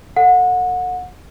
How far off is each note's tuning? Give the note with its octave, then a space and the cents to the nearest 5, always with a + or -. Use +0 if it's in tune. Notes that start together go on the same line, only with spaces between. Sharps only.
A4 +35 F#5 -30